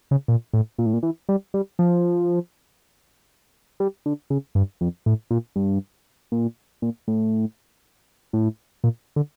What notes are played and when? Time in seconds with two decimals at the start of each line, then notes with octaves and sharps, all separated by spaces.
0.11 C#3
0.28 A#2
0.53 A2
0.78 A#2
0.86 A2
0.93 A#2
1.03 E3
1.29 G3
1.54 G3
1.79 F3
3.80 G3
4.06 D3
4.30 C#3
4.55 G2
4.81 F2
5.06 A2
5.31 A#2
5.56 G2
6.32 A#2
6.82 A#2
7.08 A2
8.33 A2
8.84 A#2
9.16 D3